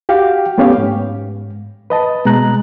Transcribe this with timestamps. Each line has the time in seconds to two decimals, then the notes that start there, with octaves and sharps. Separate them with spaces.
0.09 F#4 G4 F5 G5
0.58 A3 B3 C#4 G4 C#5 F5
0.78 G#2
1.90 B4 D#5 A5
2.25 B2 G#3 A#5 F#6